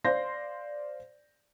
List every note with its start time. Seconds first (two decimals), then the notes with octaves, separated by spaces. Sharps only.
0.05 C5 D5 F5 C6 G6 A#6